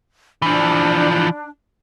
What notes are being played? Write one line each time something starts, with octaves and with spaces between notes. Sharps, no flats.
E3 F3 D4